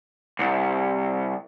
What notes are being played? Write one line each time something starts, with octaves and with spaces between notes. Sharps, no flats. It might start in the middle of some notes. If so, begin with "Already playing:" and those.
C2